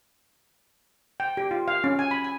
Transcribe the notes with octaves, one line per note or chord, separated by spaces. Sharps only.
G5
G4
F4
F5
C#4
G#5
B5
G#5